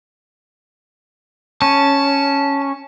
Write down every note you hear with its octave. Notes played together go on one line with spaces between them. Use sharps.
C#4 A5